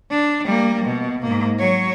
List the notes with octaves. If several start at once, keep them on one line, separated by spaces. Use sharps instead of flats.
D4
G3 A#3
B2
G#2 A#3
F#3 C#5